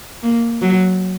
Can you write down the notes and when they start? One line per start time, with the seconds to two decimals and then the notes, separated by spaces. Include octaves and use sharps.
0.23 A#3
0.61 F#3